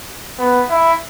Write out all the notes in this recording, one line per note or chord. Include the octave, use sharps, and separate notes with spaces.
B3
E4